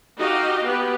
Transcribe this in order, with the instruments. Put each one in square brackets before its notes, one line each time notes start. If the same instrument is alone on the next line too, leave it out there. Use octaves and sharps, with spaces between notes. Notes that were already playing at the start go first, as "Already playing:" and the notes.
[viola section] D#4 F#4 G4 D#5 F5
B3 G4 B4